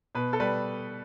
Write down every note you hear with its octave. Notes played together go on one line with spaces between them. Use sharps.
B2 B4
A4
G3 B4